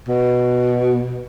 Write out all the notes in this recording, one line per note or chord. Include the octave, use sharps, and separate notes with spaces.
B2